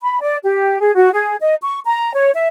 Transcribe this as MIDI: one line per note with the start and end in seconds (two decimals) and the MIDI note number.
0.01 0.20 83
0.21 0.37 74
0.44 0.81 67
0.81 0.92 68
0.95 1.11 66
1.13 1.36 68
1.41 1.55 75
1.63 1.79 85
1.85 2.12 82
2.15 2.31 73
2.35 2.48 76